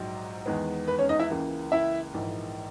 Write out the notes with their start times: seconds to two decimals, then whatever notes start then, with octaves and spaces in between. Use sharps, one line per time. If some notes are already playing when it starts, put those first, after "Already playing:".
Already playing: A#1 G#2 F#3
0.46 E2 D#3 G#3 B3
0.88 B4
0.99 C#4 C#5
1.09 D#4 D#5
1.19 E4 E5
1.30 C#2 C#3 E3 A#3
1.72 E4 E5
2.14 A#1 G#2 E3 A#3